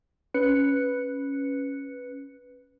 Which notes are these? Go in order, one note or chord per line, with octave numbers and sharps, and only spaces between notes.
C#4 B4 F#6 C#7